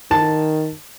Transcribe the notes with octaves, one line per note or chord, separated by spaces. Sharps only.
D#3 A5